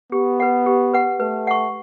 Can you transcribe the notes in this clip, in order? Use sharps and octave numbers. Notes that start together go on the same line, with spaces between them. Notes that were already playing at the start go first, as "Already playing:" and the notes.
B3 G4
B4 F#5
G4
B4 F#5
A3 B4
F#5 C#6